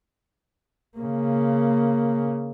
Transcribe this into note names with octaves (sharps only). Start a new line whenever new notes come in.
C#3 A#3